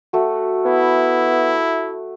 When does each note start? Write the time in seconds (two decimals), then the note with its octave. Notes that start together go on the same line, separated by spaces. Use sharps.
0.13 A3 F#4
0.65 B3 E4